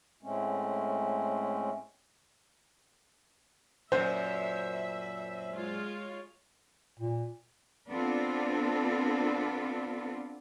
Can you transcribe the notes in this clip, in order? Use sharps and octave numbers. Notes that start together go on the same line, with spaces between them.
A2 G#3 A3 C4 C#4
F#2 A#2 C5 E5
G#3 F4 C#5
A#2
B3 C4 D4 F4 A4